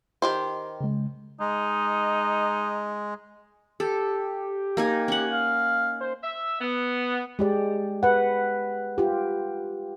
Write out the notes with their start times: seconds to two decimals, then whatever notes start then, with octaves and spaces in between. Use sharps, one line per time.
0.22 D#3 G4 C5
0.81 C#3 G#3
1.40 G#3 D#4
3.80 G4 A4
4.77 A#3 D#4 G#5
5.08 C#4 F#5
5.32 F5
6.01 C5
6.23 E5
6.61 B3
7.39 G#3 G4 D5
8.03 B4 F#5
8.98 F4 G4